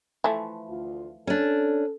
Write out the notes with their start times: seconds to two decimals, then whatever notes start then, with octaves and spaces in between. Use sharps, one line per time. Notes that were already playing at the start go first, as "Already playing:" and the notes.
0.24 E3 F3 A3
0.69 D2 F4
1.27 C#4 D4 A4